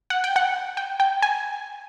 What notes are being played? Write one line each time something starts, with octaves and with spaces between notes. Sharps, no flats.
F#5
G5
F#5
G5
G5
G#5